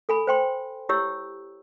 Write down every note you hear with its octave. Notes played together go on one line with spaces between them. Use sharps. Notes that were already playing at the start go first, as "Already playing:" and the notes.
A4 G#5 B5
C5 G5 C6
E4 G4 C#5 E6